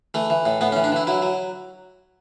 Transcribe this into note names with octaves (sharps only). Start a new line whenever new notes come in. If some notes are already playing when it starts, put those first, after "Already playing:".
E3 A3
E3
A2
A2 B3
C#4
E3
D4
E3 E4
F#3 E4
F#3